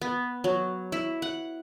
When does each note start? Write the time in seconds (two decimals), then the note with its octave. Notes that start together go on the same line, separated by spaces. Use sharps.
0.01 B3
0.44 F#3
0.92 E4
1.22 F#5